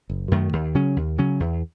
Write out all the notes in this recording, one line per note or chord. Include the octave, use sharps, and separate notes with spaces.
F#1
F#2 D#3 A3
D#2
C#3 F#3 C#4
D#2
C#3 F#3 C#4
E2